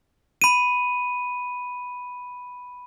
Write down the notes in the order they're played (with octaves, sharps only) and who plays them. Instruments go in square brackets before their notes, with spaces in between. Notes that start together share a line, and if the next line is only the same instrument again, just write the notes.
[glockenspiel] B5 D#7